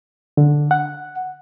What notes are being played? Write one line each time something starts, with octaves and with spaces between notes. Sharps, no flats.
D3
F#5